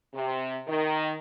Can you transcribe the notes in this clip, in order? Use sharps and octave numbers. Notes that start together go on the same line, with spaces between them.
C3
D#3